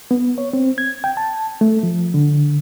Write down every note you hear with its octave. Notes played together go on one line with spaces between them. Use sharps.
B3
C#5
C4
G#6
G5
A5
A3
F3
D3